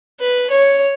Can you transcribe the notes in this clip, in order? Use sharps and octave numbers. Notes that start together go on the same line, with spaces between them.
B4
C#5